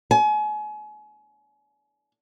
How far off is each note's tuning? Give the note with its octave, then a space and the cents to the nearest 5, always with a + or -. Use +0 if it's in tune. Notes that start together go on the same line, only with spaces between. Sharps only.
G#5 +35